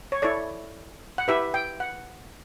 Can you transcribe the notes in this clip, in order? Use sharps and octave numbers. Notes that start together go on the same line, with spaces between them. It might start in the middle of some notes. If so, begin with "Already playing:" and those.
C#5
E4 A4 C#5 D5
F#5
E4 G4 B4 E5
G5
F#5